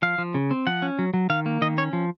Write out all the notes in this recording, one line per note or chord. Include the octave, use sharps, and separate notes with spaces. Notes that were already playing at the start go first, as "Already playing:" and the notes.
F3 F5
F3
C#3
C4
F3 F#5
C#4
F#3
F#3
D#3 F5
A#3
D#3 D#5
C#4 C#5
F3